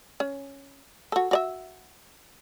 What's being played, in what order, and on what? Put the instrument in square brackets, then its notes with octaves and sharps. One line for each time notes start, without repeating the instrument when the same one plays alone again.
[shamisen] C#4
F#4 A4
F#4 D5 E5